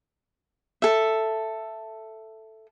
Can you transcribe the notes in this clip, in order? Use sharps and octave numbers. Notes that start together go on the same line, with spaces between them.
A4 E5